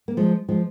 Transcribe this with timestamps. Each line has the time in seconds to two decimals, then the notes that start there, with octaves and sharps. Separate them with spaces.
0.08 A#3
0.17 F3 G#3
0.49 F3 G#3